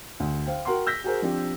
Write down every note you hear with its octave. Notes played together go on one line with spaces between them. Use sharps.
D2
C5 F5 G5
F#4 A#4 F#5 G5 C6
E6 G6 A#6 B6
F#4 G#4 A#4 C5
F3 C4 D4 G4